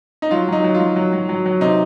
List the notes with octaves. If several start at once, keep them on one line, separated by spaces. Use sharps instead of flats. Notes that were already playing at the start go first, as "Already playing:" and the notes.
D#4
F#3 F4
F#3 D#4
F#3
F4
F#3
F#3
F#3
F#3
F#3
C3 D#4